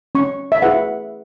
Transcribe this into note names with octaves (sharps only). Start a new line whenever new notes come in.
C#4 C#6
E5
E4 G#4 B4 F#5